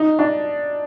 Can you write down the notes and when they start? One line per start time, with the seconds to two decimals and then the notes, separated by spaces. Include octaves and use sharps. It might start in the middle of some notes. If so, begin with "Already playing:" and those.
Already playing: D#4
0.19 D4